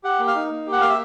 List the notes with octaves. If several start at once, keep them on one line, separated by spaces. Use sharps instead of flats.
G4 F#5
A#3
F5
D#4
A#3
G4
F#5
A#3 F5
E5